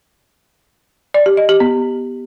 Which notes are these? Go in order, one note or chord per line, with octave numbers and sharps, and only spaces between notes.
D5
G4
D#5
G4
B3